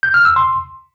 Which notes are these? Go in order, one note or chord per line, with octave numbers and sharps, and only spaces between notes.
G6
F6
E6
C6